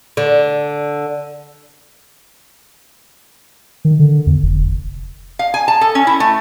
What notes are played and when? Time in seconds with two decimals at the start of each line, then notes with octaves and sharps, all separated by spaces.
0.17 D3
3.85 D#3
3.99 D3
4.27 E2
4.43 F1
5.39 F5
5.54 G#5
5.68 A5
5.81 A4
5.95 C#4
6.07 E4
6.20 A3